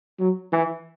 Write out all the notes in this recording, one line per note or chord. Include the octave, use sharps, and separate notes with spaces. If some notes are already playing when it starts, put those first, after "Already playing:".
F#3
E3